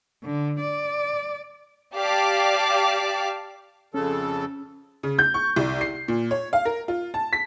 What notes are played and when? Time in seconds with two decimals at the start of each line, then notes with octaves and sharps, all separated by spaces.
0.24 D3
0.60 D5
1.95 G4 D5 F5 A5 D6
3.94 F2 C#3 C#4 A4
5.03 C#3
5.19 G6
5.34 C#6
5.56 C2
5.81 C7
6.08 A#2
6.31 C#5
6.53 F5
6.65 A#4
6.88 F4
7.14 A5
7.33 B6